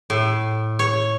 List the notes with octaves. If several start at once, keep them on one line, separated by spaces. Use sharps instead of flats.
A2
C#5